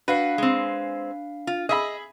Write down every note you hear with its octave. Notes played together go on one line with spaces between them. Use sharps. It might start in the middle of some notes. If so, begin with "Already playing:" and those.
D4 F#4 B4 F5 C7
G#3 C4
F4
G#4 D#5 E5 B5